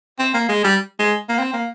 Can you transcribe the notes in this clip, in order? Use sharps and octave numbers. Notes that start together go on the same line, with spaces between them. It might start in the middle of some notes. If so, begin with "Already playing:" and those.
C4
A#3
G#3
G3
G#3
A#3
C4
A#3